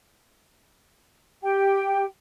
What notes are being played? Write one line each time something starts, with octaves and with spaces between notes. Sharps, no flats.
G4 G5